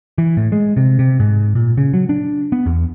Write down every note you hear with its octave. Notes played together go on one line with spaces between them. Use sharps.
E3
A2
G#3
C3
C3
G#2
A#2
C#3
F#3
D4
B3
E2